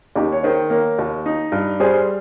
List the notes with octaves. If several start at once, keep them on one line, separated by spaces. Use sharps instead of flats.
D#2 D#4 G4
C#5
D#3 G#4 C5
A#3 A#4 C#5
D#2
D#4
G2
G3 G#4 C5